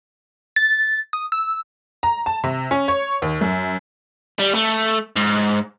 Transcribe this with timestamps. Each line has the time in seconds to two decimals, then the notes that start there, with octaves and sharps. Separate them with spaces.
0.56 A6
1.13 D#6
1.32 E6
2.03 A#5
2.26 A5
2.44 C3
2.71 C#4
2.88 C#5
3.22 D#2
3.41 F#2
4.40 G3
4.55 A3
5.16 G#2